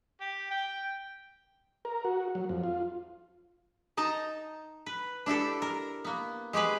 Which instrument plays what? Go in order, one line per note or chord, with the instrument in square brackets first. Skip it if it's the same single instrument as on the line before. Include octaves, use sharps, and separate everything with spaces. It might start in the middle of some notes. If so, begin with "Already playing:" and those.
[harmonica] G4
G5
[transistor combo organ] A#4
F#4
F#3
F2
F4
[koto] D#4 D#5 A5 A#5
B4
D4 E4 G4 A4
A#4
A#3 B3
G#3 G4 G#4 B4